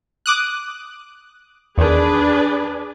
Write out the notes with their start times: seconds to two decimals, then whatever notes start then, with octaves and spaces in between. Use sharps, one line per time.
0.26 D6 D#6 F#6
1.78 E2 D#3 D4 G#4 B4